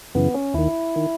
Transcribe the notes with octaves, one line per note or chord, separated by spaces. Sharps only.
F#2 C#3 E3 B3
C#4
D#2 D#3 E4
D#3